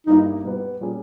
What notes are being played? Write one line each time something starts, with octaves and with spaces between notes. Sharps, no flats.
G1 G2 G3 A#3 D#4 E4
B2 G3 B3
A#2 G3 A#3 C#4 G#4